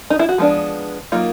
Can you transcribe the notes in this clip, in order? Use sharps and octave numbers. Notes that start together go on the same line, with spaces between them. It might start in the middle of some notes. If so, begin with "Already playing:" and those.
D#4
E4
F#4
F3 G#3 B3 D4
F#3 A#3 D#4 F4